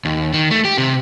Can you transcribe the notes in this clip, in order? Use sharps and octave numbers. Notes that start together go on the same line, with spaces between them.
D#2
D#3
A3
G4
C3